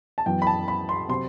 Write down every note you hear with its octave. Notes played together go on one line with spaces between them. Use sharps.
A5
F#2 E3 B3 G5
B5
A5
B5
C6
C3 F#3 C4 C6